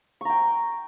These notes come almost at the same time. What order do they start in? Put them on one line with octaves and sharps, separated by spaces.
C#6 A#5 G5